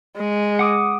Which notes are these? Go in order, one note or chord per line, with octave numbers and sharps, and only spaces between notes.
G#3
F#5 D6 D#6